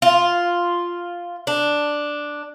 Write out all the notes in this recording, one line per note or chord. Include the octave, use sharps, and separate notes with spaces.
F4
D4